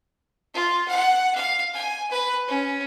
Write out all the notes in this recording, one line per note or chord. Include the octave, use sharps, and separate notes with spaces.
F4
F#5
F5
G#5
B4
C#4